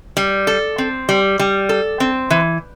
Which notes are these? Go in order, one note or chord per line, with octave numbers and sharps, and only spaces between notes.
G3
A4
C4
G3
G3
A4
C4
E3